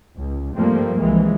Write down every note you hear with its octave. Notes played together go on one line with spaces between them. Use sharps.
C#2
G2 F3 G3 A3 A#3 C4
C2 E3 F3 G#3